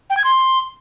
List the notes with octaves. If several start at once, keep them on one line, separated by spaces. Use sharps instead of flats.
G5
G#6
C6